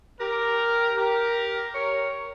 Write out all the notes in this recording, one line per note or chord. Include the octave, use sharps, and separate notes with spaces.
G4 A#4
G4 A#4
A#4 C#5